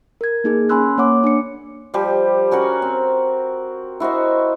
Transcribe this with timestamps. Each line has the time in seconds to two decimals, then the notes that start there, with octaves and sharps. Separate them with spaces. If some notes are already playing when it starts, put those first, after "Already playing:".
0.21 A#4 G#6
0.44 A#3 D#4 G#4
0.69 C#4 G#5 B5 C6 E6 F#6
0.98 A#3 C#5 F#5 D6
1.24 D4 C#7
1.94 F3 G3 G4
2.51 C#4 F#4 A#4 F#5
2.82 C4
4.00 E4 F#4 C5 D#5